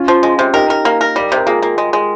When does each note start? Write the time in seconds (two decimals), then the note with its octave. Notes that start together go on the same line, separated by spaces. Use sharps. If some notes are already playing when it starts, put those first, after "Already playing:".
Already playing: C#4 F4
0.08 F3
0.23 G#3
0.39 C3
0.54 D#4 G4 A#4
0.70 A#4
0.85 A#3
1.01 A#4
1.16 G3
1.32 C3
1.37 A#4
1.47 A#3 F4 G#4
1.62 A#3
1.78 G#3
1.93 G#3